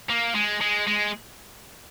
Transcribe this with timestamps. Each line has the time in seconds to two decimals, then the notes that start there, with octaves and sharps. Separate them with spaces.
0.10 A#3
0.35 G#3
0.61 G#3
0.87 G#3